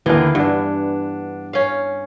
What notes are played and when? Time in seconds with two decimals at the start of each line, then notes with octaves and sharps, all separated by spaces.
0.06 D#2 D3 E3 A#3 B3
0.35 G2 D4 F#5
1.53 C#4 F5